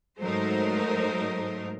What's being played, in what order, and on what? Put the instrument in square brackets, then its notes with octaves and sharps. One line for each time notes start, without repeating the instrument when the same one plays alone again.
[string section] G#2 F#3 A3 D#4 A#4 C5